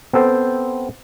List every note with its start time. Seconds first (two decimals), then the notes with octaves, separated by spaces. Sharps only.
0.13 B3 C4 A4 C5 G5